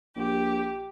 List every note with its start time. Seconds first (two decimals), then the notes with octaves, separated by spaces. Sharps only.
0.16 A#1 G4